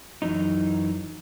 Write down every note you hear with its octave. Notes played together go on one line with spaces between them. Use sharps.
F#2 E3 F#3 D#4